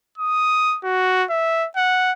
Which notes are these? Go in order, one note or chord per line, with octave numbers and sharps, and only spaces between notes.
D#6
F#4
E5
F#5